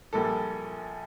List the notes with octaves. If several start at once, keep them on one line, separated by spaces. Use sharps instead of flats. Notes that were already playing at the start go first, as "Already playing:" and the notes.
A#1 A#2 G3 A#3 A4